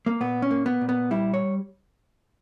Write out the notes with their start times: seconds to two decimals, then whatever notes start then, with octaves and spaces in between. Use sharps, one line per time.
0.06 A#3
0.21 A#2 B3
0.42 C#4
0.51 A#3
0.66 B3
0.81 A#2
0.89 B3
1.11 G3 E4
1.34 C#5